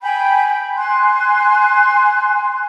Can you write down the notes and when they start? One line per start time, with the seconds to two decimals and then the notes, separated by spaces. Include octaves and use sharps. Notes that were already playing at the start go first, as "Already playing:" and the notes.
0.02 G5 G#5 B5 G6
0.77 G#5 C6 F#6